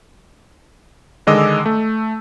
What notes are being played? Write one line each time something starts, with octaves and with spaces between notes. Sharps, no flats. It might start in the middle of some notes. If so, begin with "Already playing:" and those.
D3 D#3 G#3 D#5 D6 E6
A3